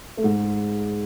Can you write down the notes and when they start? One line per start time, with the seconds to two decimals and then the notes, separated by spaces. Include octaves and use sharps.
0.17 A3
0.24 G#2 G#3